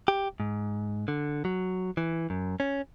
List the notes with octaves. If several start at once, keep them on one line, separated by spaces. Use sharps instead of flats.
G4
G#2
D3
F#3
E3
F#2
C#4